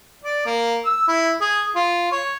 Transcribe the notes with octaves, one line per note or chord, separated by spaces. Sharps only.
D5
A#3
E6
E4
G#4
F4
C#5